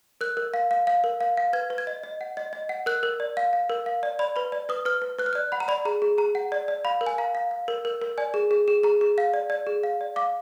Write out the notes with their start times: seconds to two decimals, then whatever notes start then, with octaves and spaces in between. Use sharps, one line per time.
0.21 A#4 F#6
0.37 A#4
0.54 F5
0.71 F5
0.87 F5
1.04 A#4
1.21 F5
1.37 F5
1.53 B4 G#6
1.70 B4
1.78 G#6
1.87 D#5
2.03 D#5
2.21 F#5
2.37 D#5
2.53 D#5
2.69 F#5
2.86 A#4 F#6
3.03 A#4
3.20 D5
3.37 F5
3.53 F5
3.70 A#4
3.86 F5
4.03 D5
4.19 D5 B5
4.36 B4 B5
4.52 D5
4.69 B4 D#6
4.85 B4 F6
5.02 B4
5.19 B4 F#6
5.26 F6
5.33 D5 F#6
5.52 F#5 B5
5.60 A#5
5.68 D5 B5
5.85 G#4 A#5
6.02 G#4
6.18 G#4 A#5
6.35 F#5
6.52 D5
6.68 D5
6.85 F5 B5
7.01 A#4
7.06 G#5
7.18 F5 A#5
7.35 F5
7.51 F5
7.68 A#4
7.85 A#4
8.02 A#4
8.18 D5 G#5
8.34 G#4
8.51 G#4
8.68 G#4
8.83 G#4 A#5
9.01 G#4
9.18 F5
9.34 D5
9.50 D5
9.67 G#4
9.83 F5
10.01 D5
10.16 F5 D6